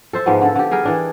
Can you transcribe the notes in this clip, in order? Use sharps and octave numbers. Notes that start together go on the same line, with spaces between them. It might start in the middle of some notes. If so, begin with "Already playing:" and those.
A4 C5 E5
G#2 F3 G#3 B3
D3 A4
D3 G4
G3 G#4 A#4 G5
E3 D4 D#5